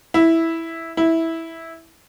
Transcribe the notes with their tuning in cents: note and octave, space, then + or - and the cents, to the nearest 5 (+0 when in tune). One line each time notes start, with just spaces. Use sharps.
E4 -5
E4 -10